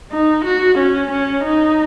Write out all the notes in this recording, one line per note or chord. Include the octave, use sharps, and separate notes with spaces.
D#4
F#4
C#4
C#4
D#4